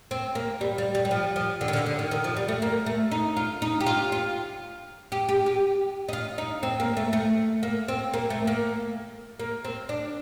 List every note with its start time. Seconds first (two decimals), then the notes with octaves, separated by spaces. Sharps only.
0.11 C4
0.35 A#3
0.61 G3
0.78 G3
0.95 G3
1.05 G3
1.11 F3
1.36 F3
1.61 D3
1.68 D#3
1.73 D3
1.86 D3
1.99 D#3
2.11 D#3
2.24 F3
2.37 G3
2.48 A3
2.62 A#3
2.86 A3
3.11 D#4
3.37 F4
3.62 D#4
3.80 G4
3.86 F4
4.12 F4
5.12 G4
5.29 G4
5.46 G4
6.09 D#4
6.13 F4
6.38 D#4
6.63 C4
6.80 A#3
6.97 A3
7.13 A3
7.63 A#3
7.88 C4
8.14 A#3
8.30 A3
8.47 A#3
9.40 A#3
9.65 C4
9.89 D4